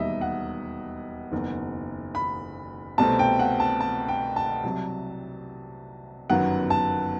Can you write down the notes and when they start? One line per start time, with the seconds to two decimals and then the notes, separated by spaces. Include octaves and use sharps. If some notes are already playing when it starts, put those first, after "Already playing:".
Already playing: E1 D#2 D#3 G3 D#5 E5
0.21 F#5
1.32 F#1 E2 D#3
2.15 B5
2.98 C2 B2 A3 C4 A5
3.19 G5
3.39 F#5
3.60 A5
3.80 A5
4.08 G5
4.36 A5
4.64 C2 C3 F#3
6.30 G1 F#2 D#3 F#3 B3 F#5
6.70 A5